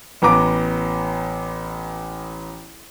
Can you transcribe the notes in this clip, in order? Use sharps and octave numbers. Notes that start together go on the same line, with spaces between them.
A1 B3 A#5 D6